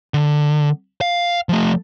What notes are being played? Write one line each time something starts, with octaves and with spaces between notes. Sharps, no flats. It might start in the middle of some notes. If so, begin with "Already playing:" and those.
D3
F5
F3 A3